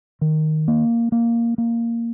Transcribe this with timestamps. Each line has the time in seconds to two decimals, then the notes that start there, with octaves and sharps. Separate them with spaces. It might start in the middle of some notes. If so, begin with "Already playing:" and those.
0.21 D#3
0.68 A#3
1.12 A#3
1.58 A#3